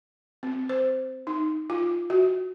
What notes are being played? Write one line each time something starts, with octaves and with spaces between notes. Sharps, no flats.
C4
C5
D#4
F4
F#4